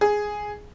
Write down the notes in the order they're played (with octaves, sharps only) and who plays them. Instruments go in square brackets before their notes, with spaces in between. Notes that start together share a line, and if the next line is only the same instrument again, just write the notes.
[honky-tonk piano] G#4